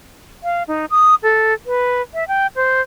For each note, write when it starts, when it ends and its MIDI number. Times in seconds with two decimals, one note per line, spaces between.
0.44 0.63 77
0.68 0.86 63
0.90 1.15 87
1.23 1.54 69
1.66 2.02 71
2.14 2.27 76
2.28 2.47 79
2.56 2.81 72